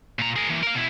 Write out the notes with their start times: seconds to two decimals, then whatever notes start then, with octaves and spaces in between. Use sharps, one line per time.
0.19 A#2 A#5
0.36 G#4 A#4
0.50 E3 A#3
0.63 A#4 F5
0.75 B2 E4